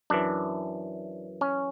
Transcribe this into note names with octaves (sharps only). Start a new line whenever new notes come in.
F#2 E3 D4
C#4